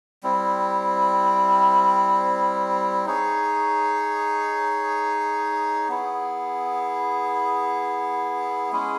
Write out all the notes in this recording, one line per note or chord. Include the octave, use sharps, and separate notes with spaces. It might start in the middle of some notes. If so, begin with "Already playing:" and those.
G3 C4 E4
D#4 G#4 C#5
B3 E4 G#4
G#3 C#4 E4 G#4